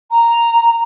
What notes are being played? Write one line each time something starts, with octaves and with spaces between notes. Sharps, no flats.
A#5